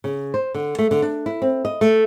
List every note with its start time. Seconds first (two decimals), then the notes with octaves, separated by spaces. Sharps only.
0.04 C#3
0.34 C5
0.54 D3
0.78 A3
0.91 D3
1.02 D4
1.26 E4
1.42 C4
1.65 D#5
1.81 A3